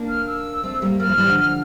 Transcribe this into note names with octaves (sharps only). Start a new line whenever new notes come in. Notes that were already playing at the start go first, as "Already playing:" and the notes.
Already playing: A#3 D4
F6
E6
A3 C4
G3 A#3
G3 A#3 F6
F3 A3
E3 G3
D3 F3